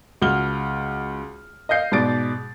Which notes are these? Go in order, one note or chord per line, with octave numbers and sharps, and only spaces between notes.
C#2 F#4 F6 G7
D#5 F5 G6 C7
G#2 B2 D5 A6 D7